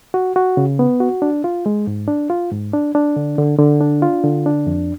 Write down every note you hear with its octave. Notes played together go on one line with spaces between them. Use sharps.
F#4
F#4
C#3
B3
F#4
D4
F4
G#3
G#2
D4
F4
G#2
D4
D4
D3
D3
D3
D4
F4
D3
D4
F2